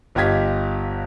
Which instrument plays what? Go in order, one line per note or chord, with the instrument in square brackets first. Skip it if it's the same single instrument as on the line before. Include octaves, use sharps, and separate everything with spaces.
[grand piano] G1 F4 G4 D#5 G#6 B6